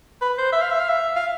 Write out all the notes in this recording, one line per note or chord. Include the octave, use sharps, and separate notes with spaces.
B4
C5
E5
F5
E5
F5
E5
F5